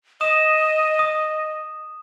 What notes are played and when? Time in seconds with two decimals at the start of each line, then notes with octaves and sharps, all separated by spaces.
0.21 D#5 D#6 E7
0.99 D#6